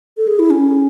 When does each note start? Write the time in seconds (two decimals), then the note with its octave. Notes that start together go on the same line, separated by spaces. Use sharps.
0.17 A4
0.27 G#4
0.39 E4
0.50 C#4